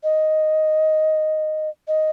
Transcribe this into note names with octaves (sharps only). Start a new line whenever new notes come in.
D#5
D#5